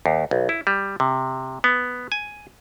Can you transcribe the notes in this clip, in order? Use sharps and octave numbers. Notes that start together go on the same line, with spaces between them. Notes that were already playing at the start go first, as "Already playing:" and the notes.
D#2
B1
E4
G3
C3
B3
G#5